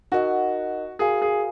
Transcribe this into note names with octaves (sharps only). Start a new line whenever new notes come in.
D#4 F#4 A#4 D#5 F#5
F#4 G#4 A#4 F5 G#5
G#4